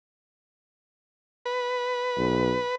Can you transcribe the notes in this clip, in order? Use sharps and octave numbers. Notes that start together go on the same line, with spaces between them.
B4
B1